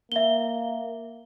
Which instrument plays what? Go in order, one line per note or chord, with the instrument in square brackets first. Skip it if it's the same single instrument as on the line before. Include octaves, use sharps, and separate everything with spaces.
[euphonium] A#3 [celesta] E5 G7